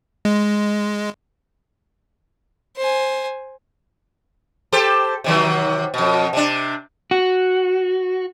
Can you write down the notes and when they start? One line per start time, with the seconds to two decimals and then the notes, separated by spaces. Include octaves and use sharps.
0.25 G#3
2.77 C5 G#5
4.72 G4 A4 C5
5.24 C3 D#3 F#3
5.94 F2 B2
6.33 C3 D4
7.11 F#4